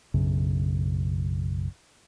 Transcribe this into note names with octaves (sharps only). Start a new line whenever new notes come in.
B1 F#2 C#3